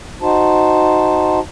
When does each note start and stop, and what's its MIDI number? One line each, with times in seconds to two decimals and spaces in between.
0.22 1.39 63
0.22 1.39 66
0.22 1.39 72
0.22 1.39 81